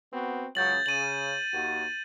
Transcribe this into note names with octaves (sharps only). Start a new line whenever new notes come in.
B3 C4 F#4
C#2 C#3 F#3 G6 A6 F#7
C#3 D#7 F#7
D#2 F#4